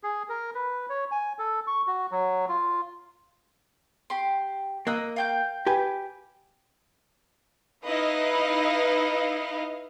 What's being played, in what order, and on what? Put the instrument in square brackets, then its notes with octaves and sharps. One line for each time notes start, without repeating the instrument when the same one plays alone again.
[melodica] G#4
A#4
B4
C#5
G#5
A4
C#6
F#4
F#3
F4
[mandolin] G4 C6
[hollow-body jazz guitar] A#3 [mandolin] D#5 E6 F#6
[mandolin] F5 G5 G6
[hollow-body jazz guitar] G4 B4 G#5
[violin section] D#4 E4 B4 D#5 F5